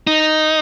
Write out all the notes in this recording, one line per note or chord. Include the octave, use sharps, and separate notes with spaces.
D#4